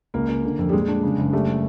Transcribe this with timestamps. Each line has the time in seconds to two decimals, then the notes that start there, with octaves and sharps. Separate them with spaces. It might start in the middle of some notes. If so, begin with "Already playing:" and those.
0.14 C#2 A#3
0.29 C#2
0.44 D3
0.59 F2
0.69 G3
0.73 A#2 G#3
0.88 D4
1.03 C#3
1.18 F#1
1.33 G3 A3